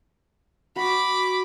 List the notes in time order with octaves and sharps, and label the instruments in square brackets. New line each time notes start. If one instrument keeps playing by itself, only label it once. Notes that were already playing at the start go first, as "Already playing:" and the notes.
[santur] F#4 [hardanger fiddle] B5 D6